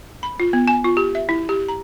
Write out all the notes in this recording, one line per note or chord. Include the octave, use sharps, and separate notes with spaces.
B5
F4
B3
G#5
F4
G4
E5
E4
G4
A#5